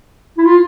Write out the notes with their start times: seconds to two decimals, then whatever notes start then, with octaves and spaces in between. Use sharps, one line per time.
0.38 E4
0.46 F4